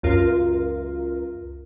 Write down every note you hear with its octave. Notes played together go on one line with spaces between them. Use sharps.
C#2 F#2 F4 A#4